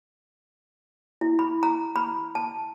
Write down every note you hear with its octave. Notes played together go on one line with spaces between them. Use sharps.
E4
B5
A#5
B5
A5